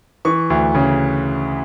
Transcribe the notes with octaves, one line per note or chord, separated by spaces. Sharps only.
E3 C#6
D2
C#3